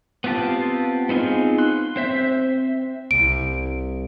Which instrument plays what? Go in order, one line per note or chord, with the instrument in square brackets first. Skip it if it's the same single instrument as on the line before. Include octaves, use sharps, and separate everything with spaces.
[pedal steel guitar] B3 C4 F4 G4 A5
B3 C4 D#4 F4 G#4
C6 F#6
C4 C5 E5
[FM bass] C2 [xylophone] D7